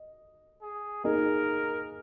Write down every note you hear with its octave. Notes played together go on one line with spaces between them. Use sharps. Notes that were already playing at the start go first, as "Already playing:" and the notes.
Already playing: D#5
G#4
A#3 D#4 G#4 A#4 D#5